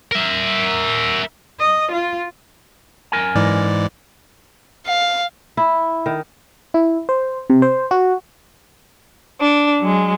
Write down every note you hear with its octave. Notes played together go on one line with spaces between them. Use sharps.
A#4 E5
D#5
F4
F#2 A#4 G#5
G#2 E3 D5
F5
E4
D#3
E4
C5
C3
C5
F#4
D4
F#3 G#3